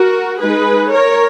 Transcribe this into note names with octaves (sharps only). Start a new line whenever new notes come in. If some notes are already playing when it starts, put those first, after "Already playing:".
Already playing: F#4 A#4
G#3 D#4 G#4 B4
A#4 C#5